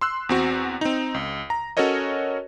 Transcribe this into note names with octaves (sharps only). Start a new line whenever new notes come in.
C6 E6 F#6
E2 C4 F#4
C4 D#4
C#2
A#5
C#4 F#4 A4 A#4 C#5 D#5